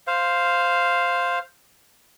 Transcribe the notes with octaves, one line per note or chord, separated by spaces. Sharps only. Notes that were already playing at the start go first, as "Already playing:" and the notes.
C5 F5